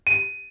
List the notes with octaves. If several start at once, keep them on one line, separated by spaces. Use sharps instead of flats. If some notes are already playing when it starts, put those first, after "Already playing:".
D#7